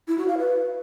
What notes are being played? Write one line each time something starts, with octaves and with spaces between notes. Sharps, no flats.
E4
F#4
F5
B4